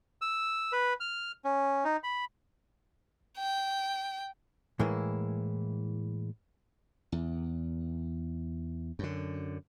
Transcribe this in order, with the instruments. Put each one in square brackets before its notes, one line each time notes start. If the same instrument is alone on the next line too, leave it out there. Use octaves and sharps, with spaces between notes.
[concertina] E6
B4
F6
C#4
D#4
B5
[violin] G5
[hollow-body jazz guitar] A2 E3 G#3 A#3 E4
[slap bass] E2
F#2 D3